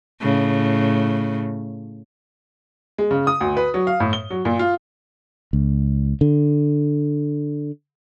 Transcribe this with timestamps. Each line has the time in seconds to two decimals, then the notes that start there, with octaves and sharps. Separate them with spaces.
0.21 A2 C#3
2.98 G#3
3.11 C#3
3.27 D#6
3.41 D2
3.57 B4
3.74 F#3
3.87 F5
4.00 A2
4.13 G7
4.30 F#3
4.45 A#2
4.59 F4
5.53 C#2
6.21 D3